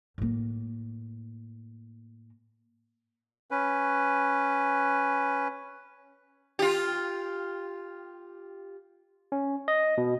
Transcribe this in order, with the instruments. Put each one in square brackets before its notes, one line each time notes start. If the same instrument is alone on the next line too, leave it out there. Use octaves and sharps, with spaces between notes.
[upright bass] A2 A#3
[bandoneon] C#4 B4
[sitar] F4 G4
[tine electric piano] C#4
D#5
B2